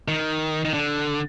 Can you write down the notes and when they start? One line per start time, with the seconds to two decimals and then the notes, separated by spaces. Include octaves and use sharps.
0.08 D#3
0.65 D#3
0.74 D3